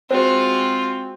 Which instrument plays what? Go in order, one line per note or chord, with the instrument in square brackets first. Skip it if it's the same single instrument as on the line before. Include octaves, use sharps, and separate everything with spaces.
[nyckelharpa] G#3 F#4 [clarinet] C4 [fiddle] F4 [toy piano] C5